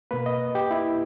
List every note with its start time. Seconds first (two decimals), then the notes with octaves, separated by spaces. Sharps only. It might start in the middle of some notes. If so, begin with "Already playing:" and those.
0.11 B2 A#3 B4
0.26 D#5
0.55 G4
0.71 E4